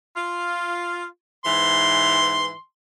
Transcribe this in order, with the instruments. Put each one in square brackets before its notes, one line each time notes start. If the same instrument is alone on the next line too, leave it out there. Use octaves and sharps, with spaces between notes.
[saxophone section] F4
[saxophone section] G#2 E3 [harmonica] C6